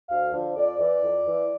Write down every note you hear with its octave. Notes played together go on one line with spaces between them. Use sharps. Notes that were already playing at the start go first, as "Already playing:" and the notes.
D2 F5
D3 F3
F2 D5
E3 D5
F2
E3